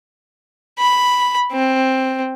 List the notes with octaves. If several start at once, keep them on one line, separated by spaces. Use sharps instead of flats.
B5
C4